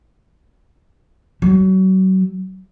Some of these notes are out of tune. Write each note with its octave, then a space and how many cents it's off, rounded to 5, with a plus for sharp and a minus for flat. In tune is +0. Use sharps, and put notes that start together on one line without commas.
F#3 +30